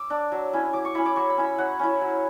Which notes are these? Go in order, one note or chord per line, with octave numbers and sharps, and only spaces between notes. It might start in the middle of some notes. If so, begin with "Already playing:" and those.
Already playing: D6 E6
D4
F#3
C#4 E4
F#3 D6
C#6
C#4 E4 B5
D6
F#3 C#6
B5
C#4 E4
B5
F#3 F#5
C#4 E4
F#3